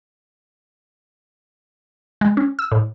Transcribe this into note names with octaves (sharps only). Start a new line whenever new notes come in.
G#3
C#4
E6
A2